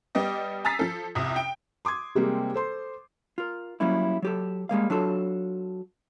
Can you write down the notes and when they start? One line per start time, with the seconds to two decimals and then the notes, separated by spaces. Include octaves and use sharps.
0.15 G3 B3 G4 D#5
0.65 G#5 A#5 E6 A6 B6 C7
0.79 F3 A4
1.15 C2 F2 C3
1.36 G5 D7
1.85 C6 D6 D#6 G#6
2.15 C3 G3 G#3 A#3 C4
2.54 A4 C5 C6
3.38 F4 A#4
3.80 F#3 G3 A#3 C#4 E4
4.22 F#3 G4 A4
4.69 G3 G#3 A#3 F5
4.90 F#3 D4 F4 A4